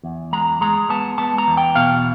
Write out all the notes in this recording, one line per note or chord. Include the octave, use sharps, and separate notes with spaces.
E2
G#3 A#5
G#3 A#5
B3 A5
B3 A5
A#5
E2
G5
B2 F5